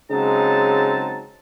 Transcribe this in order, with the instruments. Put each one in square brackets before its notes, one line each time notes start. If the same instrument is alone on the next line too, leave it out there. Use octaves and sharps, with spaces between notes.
[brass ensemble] C#3 F#3 G#3 C4 D#4 A5